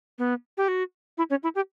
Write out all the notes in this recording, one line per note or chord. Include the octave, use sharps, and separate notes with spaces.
B3
G4
F#4
E4
C#4
E4
G4